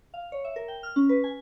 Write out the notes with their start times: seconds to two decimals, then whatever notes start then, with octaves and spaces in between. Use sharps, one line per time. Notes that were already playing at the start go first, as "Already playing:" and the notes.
0.14 F5
0.32 C#5
0.44 E5
0.56 A#4
0.68 G5
0.83 F6
0.96 C#4
1.09 B4
1.24 G#5